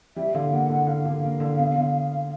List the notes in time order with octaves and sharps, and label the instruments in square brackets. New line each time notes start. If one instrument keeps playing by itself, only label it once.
[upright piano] G3 [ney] E5
[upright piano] D3 [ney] F5
[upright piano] A#3 [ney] F#5
[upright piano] D3 [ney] F#5
[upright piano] D3 [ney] F5
[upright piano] D3
A#3
D3
B3
D3